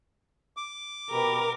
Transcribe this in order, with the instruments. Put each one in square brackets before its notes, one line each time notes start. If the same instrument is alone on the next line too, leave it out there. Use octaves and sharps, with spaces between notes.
[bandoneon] D6
[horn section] B2 G4 B5 [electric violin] A#4